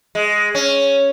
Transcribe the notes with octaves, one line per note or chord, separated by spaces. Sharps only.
G#3
C#4